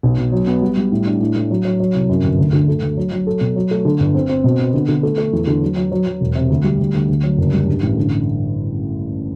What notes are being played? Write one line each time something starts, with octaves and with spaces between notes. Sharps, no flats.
B1
B2
F#3
B3
G3
G3
A2
D4
A2
A2
F#3
F#3
F#3
C2
F#2
G1
D2
D3
A3
D2
F#3
F#3
A4
B2
F#3
A3
D3
G1
C4
C4
B2
B3
D3
D3
A3
A3
E2
D3
F#3
F#3
F#3
F#3
E1
C3
D2
G3
D2
D2
D2
F#3
F#1
G3
G2
A1
D3